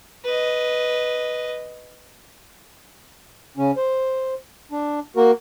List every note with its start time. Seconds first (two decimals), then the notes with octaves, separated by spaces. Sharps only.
0.25 B4 D#5
3.57 C#3 C#4
3.77 C5
4.71 D4
5.16 A#3 F#4 A#4